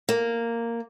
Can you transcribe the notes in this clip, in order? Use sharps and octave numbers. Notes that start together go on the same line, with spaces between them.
A#3